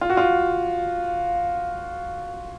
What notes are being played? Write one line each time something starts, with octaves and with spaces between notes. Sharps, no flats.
F4
F#4
F4